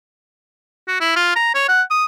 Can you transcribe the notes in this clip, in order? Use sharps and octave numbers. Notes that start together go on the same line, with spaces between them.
F#4
E4
F4
A#5
C#5
F#5
D#6